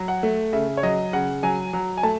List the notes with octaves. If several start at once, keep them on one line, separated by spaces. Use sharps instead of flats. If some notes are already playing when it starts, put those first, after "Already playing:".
Already playing: F#3
F#5
A3
C#3 E5
C#5
F#3 D#5
C#3 F#5
F#3 G#5
F#3
G#5
A3 A5